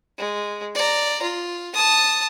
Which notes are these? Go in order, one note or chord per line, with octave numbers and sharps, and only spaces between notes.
G#3
D5 A#5
F4
A5 D#6